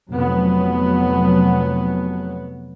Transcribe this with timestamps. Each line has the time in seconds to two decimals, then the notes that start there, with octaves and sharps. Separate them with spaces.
0.10 F1 F#3 B3